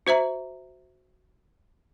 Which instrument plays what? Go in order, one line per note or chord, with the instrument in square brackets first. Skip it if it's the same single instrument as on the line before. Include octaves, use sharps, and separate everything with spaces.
[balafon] F#4 C5 E5 A#5